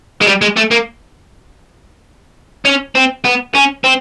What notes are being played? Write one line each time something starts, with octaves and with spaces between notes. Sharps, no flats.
G#3
G3
G#3
A3
A#3
C#4
C4
B3
C#4
C4